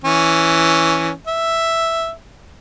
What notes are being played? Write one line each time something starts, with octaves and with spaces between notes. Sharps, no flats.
E3 C#4
E5